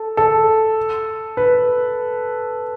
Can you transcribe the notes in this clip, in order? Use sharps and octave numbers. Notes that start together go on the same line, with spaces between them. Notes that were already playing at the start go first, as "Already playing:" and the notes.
Already playing: A4
A4
B4